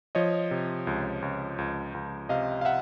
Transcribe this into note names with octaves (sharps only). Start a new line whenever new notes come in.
F3 C#5 D#5
C3
C#2
C#2
C#2
C#2
C3 D#5 F5
F5
E5 F#5